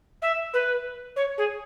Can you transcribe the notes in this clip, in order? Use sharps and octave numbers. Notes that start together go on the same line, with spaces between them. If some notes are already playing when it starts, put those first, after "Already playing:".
E5
B4
C#5
G#4